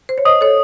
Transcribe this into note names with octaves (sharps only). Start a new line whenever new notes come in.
C5
C#5
C5 D#5 D#6
A4 C#5